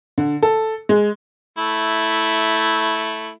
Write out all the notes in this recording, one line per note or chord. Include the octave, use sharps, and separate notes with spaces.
D3
A4
G#3
A3 E4